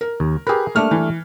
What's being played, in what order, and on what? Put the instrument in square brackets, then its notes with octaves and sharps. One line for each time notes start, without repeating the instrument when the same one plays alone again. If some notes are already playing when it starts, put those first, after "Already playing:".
[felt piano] A#4
[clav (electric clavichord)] D#2
[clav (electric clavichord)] G4 B4 [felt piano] G#4 A#4
[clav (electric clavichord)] G3 A3 D4 [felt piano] A#3 F6
[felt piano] E3